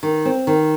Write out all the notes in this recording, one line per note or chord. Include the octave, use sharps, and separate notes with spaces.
D#3
C4
D#3